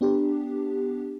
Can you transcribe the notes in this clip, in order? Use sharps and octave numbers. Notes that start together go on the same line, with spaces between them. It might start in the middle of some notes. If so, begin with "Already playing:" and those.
B3 D4 G4